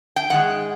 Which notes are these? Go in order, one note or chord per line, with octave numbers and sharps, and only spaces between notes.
G5
G#2 D#3 G#3 F#5